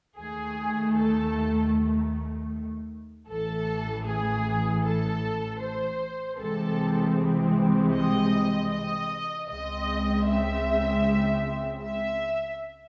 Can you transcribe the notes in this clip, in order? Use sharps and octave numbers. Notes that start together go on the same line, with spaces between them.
D#2 D#3 A3 G#4
A4
A1 A2 E3 A4
G#4
A4
C5
C2 C3 E3 G#3 C4 A4
D#5
D#5
C#2 C#3 G#3 C4 D#5
E5
E5